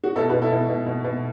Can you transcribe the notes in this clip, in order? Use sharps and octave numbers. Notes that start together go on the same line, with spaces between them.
F#4
B2 E4 A4
F#4 B4
B2
E4 A4
B2
B2
B2
B2